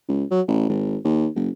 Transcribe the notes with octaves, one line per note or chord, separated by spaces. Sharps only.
C#2
F#3
A1
G#1
D#2
F#1